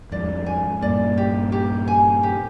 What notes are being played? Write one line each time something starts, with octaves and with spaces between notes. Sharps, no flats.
F2 G#2 D5
G#5
G2 A#2 D5
G4
G4
G#5
G4